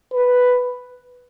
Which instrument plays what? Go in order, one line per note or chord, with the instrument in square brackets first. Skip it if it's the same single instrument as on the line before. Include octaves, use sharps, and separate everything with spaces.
[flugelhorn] B4